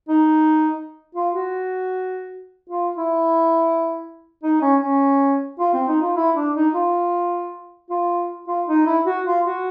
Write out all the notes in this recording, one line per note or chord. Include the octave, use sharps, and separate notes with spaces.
D#4
F4
F#4
F4
E4
D#4
C#4
C#4
F4
C4
D#4
F4
E4
D4
D#4
F4
F4
F4
D#4
E4
F#4
F4
F#4